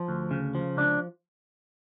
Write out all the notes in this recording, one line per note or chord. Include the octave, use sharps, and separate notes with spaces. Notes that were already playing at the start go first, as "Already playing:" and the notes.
Already playing: F3
D2
C#3
F3
C#2 D4